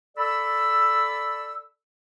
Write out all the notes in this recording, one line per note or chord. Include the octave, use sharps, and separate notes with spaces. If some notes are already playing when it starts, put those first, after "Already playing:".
A4 D5 B5 E6